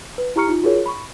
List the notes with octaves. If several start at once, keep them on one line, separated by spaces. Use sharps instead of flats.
B4
E4 G4 A#5 C#6 F6 C#7
D#4 F4
F4 F#4 G#4 A#4 C#5
B5 C#6